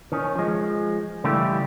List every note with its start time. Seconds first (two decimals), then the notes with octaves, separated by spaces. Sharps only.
0.12 D#3 C#4
0.36 F3 G#3
1.24 C#3 E3 G3 A3 E4 G4